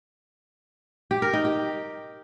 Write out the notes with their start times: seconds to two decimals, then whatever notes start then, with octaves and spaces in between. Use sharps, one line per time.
1.11 G4
1.22 A#4
1.33 D#4
1.45 G4